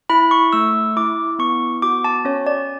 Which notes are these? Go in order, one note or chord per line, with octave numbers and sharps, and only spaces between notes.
E4 B5
C#6
A3 E6
E4 D6
B3 C#6
F#4 D6
A5
C#4 C#5
D5